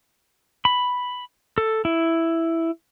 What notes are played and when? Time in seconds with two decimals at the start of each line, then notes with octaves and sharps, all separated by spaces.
0.65 B5
1.58 A4
1.85 E4